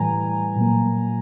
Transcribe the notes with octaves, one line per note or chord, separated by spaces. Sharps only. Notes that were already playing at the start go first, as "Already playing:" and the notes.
Already playing: A2 E3 G3 G#5 A#5
A#2 F#3 A#3